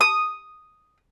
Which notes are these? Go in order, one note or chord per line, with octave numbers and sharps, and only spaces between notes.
D#6